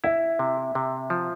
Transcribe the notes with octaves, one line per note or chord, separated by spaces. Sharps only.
E4 E5
C3
C3
F3